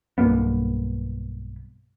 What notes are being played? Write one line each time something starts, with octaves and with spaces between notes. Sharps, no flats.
B1 G2 A#3 B3